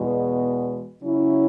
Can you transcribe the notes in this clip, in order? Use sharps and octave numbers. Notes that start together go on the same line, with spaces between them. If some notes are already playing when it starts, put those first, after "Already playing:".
Already playing: E2 B2 G#3
C#3 F#3 C#4 E4